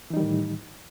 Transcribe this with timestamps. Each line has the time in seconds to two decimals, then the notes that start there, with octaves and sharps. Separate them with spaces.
0.10 E3
0.14 D#4
0.17 G3
0.20 D#3
0.23 A2